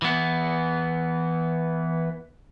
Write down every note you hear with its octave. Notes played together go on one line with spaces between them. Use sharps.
E3 B3